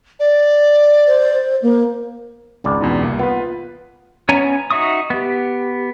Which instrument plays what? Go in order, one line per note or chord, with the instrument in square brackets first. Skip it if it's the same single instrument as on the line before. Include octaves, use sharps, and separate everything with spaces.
[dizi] D5
[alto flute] C5
A#3
[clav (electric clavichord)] G#1 C#2 D5
[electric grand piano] E2 B2 D#4
C2 A#3
[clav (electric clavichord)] B3 [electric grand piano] F4 B4
[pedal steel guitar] B3 C#4 C#5 G#5 A#5
D#4 F#4 E5 C#6 D#6
B3 G4